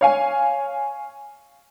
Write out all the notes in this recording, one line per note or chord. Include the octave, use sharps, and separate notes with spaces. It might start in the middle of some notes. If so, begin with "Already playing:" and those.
C#5 F5 G#5